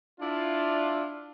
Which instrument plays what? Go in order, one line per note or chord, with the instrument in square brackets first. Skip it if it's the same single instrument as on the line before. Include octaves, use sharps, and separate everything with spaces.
[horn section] D4 E4 F4